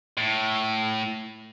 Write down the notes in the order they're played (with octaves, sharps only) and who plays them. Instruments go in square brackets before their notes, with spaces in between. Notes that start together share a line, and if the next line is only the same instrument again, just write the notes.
[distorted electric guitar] A2